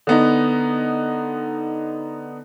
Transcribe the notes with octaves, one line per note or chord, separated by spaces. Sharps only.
D3 B3 D#4